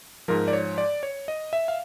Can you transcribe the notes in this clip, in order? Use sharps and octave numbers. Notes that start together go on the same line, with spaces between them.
G#2 F3 A#4
D5
C#5
D5
C#5
D#5
E5
F5